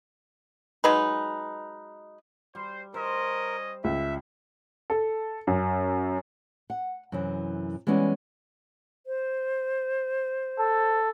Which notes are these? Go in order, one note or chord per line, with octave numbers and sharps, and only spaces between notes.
F#3 G#3 D#4 B4
G3 C5
C#4 A#4 C5 D#5
C#2 E5
A4
F#2
F#5
F#2 C3 E3
E3 G3 G#3 B3 C#4 E4
C5
A4